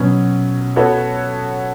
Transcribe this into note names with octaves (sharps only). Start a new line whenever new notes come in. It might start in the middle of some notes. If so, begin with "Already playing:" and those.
Already playing: B2 F#3 C#4
B3 F#4 A4 C#5